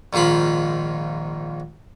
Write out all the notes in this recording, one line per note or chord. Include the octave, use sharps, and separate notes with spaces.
A#1 G#2 D#3 F4 B5